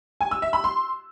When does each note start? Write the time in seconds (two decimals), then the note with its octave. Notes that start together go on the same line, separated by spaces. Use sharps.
0.21 G#5
0.31 E6
0.42 E5
0.53 B5
0.64 C6